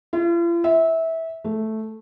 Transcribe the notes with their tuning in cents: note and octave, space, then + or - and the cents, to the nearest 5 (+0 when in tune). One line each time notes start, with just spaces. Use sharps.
F4 -45
E5 -20
A3 -5